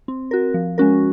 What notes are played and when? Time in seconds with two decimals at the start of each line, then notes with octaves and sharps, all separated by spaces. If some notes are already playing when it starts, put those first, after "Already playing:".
0.08 C4
0.31 F#4 A#4
0.54 F3
0.78 G#3 C#4 F#4 A#4